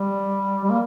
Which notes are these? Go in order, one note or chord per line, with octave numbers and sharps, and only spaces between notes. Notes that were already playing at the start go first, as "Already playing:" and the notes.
Already playing: G3
G3
A#3